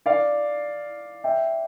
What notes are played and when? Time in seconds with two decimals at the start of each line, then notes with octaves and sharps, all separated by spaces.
0.06 D5 F5
1.24 E5 G5